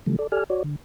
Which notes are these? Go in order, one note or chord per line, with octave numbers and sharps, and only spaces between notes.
C#3 E3 F3 G3 A3
A4 D5
G4 A4 D5 G#5 F6
F#4 C#5 D5
D3